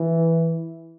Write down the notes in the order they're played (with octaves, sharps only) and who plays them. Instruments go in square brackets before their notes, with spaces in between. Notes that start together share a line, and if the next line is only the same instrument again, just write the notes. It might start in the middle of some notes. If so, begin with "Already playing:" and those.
Already playing: [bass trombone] E3